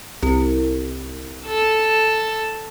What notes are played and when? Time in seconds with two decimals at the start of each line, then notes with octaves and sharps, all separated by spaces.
0.23 C2
1.46 A4